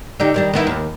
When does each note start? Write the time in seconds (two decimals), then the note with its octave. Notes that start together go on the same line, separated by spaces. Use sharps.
0.20 D3 D#4 G4
0.34 D#3 G3 D4
0.54 D#3 B3 E4
0.67 D#2